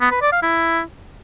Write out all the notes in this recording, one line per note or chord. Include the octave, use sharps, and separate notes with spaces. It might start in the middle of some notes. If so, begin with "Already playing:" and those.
B3
B4
D5
F5
E4